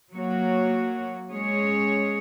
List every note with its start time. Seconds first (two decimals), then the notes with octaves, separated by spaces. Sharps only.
0.12 F#3 A#3 F#4 C#5
1.29 G#3 C#4 G#4 C#5